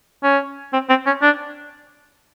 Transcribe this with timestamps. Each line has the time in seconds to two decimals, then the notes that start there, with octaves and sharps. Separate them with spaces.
0.23 C#4
0.73 C4
0.89 C4
1.06 C#4
1.22 D4